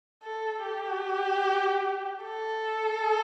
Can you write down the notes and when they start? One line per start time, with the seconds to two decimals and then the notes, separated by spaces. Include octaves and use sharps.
0.24 A4
0.63 G4
2.24 A4